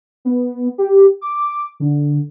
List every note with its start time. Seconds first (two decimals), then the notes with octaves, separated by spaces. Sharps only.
0.25 B3
0.78 G4
1.21 D6
1.80 D3